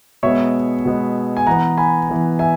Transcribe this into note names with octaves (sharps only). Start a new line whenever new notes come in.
B2 G#3 B3 C#5 E5
B2 G#3 B3
G#5
E3 B3 F#5 A#5
G#5 B5
E3 B3
E5 G#5